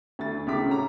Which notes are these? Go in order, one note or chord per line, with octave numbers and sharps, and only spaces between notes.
D2 A6
C#2 A2 C#3 D6 B6
C#4 F#4 A#5